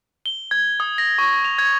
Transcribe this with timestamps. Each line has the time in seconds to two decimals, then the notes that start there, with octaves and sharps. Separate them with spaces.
0.26 G7
0.51 G#6
0.80 D#6
0.98 A#6
1.18 C#6
1.45 F7
1.58 G#6